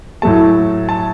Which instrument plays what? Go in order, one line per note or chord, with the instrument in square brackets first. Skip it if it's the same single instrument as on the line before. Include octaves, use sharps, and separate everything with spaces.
[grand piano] A2 F#3 A3 A5
A5